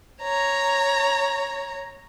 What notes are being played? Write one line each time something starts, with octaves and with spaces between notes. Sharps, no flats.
C#5 A#5